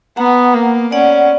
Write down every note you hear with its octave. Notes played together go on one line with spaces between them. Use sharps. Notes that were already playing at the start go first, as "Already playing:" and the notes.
B3 F#5 A#5
A#3
C#4 D5 F#5